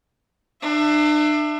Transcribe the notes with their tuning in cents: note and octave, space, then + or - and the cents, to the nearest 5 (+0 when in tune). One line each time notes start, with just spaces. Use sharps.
D4 +35 E5 +10